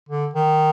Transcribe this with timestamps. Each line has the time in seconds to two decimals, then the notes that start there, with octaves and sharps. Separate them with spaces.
0.09 D3
0.33 D#3